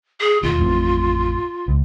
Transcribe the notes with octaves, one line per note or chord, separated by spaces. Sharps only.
G#4
E1 D#2 F4
A1 F2 A2
C#2